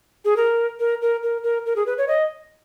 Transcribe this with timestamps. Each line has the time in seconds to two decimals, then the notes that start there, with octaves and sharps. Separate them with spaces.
0.25 G#4
0.37 A#4
0.80 A#4
1.02 A#4
1.23 A#4
1.43 A#4
1.66 A#4
1.76 G#4
1.86 B4
1.98 C#5
2.08 D#5